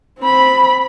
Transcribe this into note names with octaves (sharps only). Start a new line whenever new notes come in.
C4 B5